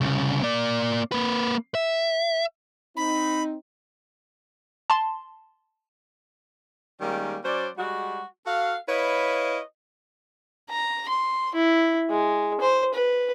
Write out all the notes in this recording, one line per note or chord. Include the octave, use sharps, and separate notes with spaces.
C2 C#3
A#3 D5
A#3 B4
E5
C4 D#4 B5
A5 C6
D#3 G3 G#3 A#3 C#4
F#3 C#4 C5 D5
G3 G#3 F#4
F#4 A4 F5
E4 B4 C#5 D#5 F5
A#5
C6
E4
G#3
C5
B4